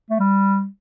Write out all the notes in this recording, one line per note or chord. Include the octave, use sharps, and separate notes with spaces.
A3
G3